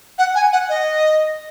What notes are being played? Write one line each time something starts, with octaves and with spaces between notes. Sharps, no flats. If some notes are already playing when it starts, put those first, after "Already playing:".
F#5
G#5
F#5
D#5